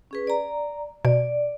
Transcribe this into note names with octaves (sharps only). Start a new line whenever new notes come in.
C#4 G#4 B4
D5 A#5
B2 D5